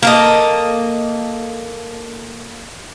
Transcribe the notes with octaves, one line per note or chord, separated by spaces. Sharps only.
A#3 A4 D#5